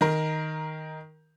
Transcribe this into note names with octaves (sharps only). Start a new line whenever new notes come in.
D#3 A#4